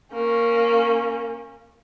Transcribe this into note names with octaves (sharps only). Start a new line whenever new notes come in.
A#3 C#4